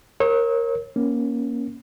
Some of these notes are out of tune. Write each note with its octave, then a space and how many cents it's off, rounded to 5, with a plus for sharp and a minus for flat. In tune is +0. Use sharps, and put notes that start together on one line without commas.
A#4 +0 C#5 -35 E6 -45
A#3 +20 C#4 +0